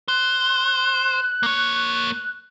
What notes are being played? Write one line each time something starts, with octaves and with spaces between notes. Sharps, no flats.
C5 F#6
A#3 C#5